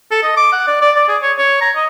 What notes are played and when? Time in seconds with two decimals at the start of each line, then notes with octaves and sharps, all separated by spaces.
0.11 A4
0.23 D#5
0.37 D6
0.52 F#5
0.67 D5
0.82 D5
0.96 D5
1.08 G#4
1.22 C#5
1.38 C#5
1.61 A#5
1.76 D#5